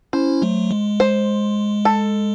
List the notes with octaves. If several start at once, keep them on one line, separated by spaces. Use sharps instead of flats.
C#4 E4 C5
F#3 A3
G#3
C5
A4